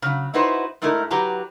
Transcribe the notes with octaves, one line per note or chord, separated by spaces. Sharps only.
C#3 F#3
D#4 E4 F#4 B4 C5
G#2 A3 D#4 E4 A#4
F#3 G4 B4 A#5